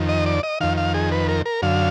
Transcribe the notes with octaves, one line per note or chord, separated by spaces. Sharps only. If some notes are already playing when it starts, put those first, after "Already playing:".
Already playing: F2 D#3
D#5
D5
D#5
F2 D#3 F5
F5
G#4
B4
A#4
A#4
F#2 D3 F5